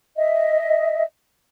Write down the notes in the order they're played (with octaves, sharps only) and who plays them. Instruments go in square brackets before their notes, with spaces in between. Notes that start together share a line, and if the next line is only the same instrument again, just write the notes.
[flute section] D#5 E5